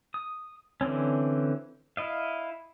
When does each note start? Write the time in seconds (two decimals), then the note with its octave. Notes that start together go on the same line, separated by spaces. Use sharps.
0.14 D#6
0.81 D3 E3 C4 C#4
1.97 E4 D#5 F5